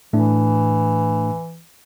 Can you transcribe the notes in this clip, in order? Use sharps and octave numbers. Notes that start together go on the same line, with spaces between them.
A2 E3 A3 D4